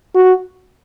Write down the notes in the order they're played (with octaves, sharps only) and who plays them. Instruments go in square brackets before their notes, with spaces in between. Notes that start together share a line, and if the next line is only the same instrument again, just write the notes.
[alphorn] F#4